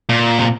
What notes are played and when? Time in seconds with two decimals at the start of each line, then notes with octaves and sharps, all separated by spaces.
0.09 A#2
0.39 C3